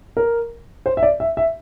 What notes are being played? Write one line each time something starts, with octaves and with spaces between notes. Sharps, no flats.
A#4
C5
E5
D5
E5
E5